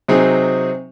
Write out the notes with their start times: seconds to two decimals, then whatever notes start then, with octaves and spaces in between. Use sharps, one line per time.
0.08 C3 F#3 C4 D#4 G#4